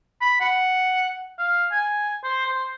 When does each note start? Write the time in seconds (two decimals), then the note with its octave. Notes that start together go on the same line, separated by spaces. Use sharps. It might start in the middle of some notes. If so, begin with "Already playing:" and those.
0.21 B5
0.41 F#5
1.38 F5
1.72 G#5
2.24 C5
2.46 C5